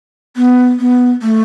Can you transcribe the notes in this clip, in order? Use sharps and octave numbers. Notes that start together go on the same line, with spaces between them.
B3
B3
A3